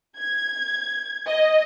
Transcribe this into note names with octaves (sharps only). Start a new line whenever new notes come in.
G#6
D#5